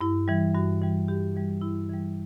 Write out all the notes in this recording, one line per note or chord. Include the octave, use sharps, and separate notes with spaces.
G2 E4
E3 G3
G2 F#4
E3 G3
G2 G4
E3 G3
G2 E4
E3 G3